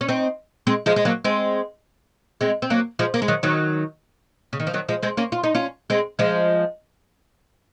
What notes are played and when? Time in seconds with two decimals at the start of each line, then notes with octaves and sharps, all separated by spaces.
0.01 C#4
0.09 C4 D#4
0.67 G#3 C4
0.86 F3 G#3
0.96 G#3
1.05 F#3 A#3
1.24 G#3 C4
2.41 G#3 C4
2.62 C4
2.70 F#3 A#3
2.99 F3 G#3
3.14 A#3
3.22 G#3
3.28 D#3 F#3
3.43 D#3 F#3
4.53 C#3
4.60 D#3
4.67 F3
4.73 D#3 F#3
4.89 F3 G#3
5.03 G#3 C4
5.17 A#3 C#4
5.32 F4
5.43 D#4
5.55 C#4 F4
5.90 G#3 C4
6.19 F3 G#3